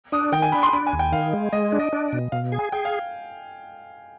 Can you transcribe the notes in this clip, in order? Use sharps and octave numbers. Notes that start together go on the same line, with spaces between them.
D4 D#6
D#3 G5
G#5
D4 B5
C6
D4 B5
G#5
D#2
G5
D#3 F5
G#3
G#3 D#5
D4
D#5
D4
B2
B2 F5
G#4
G#5
G#4 G5
F5